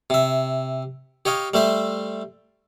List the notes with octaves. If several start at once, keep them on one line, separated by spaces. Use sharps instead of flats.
C3 E5
G4 C#5 D#5 F5
G3 A3 C5 E5